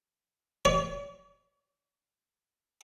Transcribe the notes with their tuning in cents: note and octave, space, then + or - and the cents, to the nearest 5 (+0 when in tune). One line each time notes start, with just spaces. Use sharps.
C#5 +45